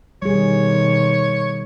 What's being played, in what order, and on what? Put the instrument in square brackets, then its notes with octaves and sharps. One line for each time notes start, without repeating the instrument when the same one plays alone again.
[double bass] B2 D#3 [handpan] G3 G#4 [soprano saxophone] C#5